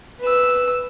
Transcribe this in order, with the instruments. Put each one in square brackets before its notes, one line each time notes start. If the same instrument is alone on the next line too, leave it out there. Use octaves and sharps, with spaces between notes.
[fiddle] B4 E6